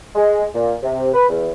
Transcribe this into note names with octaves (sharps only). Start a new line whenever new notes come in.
G#3
A#2
C3
B4
E2